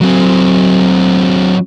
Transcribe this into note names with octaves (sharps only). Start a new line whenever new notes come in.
F#3 C4